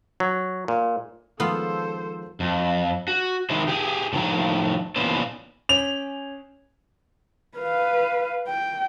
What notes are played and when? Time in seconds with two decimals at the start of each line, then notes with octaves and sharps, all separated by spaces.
0.20 F#3
0.68 A#2
1.40 D#3 F3 G#3 B3 F4 A4 C5
2.40 F2
3.08 F#4
3.50 D#3 G#3 E4 C5
3.68 G4 G#4
4.13 A2 D#3 F3 A#5
4.96 A#2 E3 B3 C#4 C5
5.69 C#4 C#5 F7
7.58 B4 F5
8.48 G5